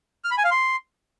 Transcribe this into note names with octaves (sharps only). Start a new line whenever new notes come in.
F6
B5
G#5
F5
C6